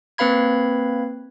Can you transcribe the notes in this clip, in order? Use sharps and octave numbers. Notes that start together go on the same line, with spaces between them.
A#3 C4 B4 F5 B5 G#6